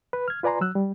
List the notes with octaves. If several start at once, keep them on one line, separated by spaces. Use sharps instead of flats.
B4
F6 G#6
F4 B4 D5 G#5 A#5 C6
F#3 E6 F#6
G3